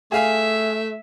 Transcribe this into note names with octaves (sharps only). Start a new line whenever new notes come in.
A3 G#4 E5 F5 G#5